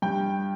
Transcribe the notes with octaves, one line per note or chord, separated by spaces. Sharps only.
G2 G5